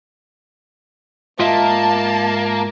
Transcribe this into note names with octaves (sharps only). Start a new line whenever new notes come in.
G#2 A#3 F4 D#5 E5 A5